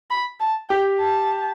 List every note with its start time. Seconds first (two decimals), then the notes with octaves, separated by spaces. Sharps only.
0.10 B5
0.40 A5
0.69 G4 G5
1.00 A5